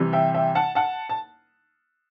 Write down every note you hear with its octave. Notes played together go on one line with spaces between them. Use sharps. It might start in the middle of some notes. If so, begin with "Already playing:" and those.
Already playing: C3 E3 G3
E5 G5
E5 G5
F#5 A5
F#5 A5
A5